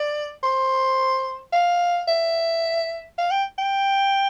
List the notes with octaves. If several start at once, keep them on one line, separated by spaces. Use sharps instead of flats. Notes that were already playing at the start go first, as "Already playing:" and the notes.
Already playing: D5
C5
F5
E5
F5
G5
G5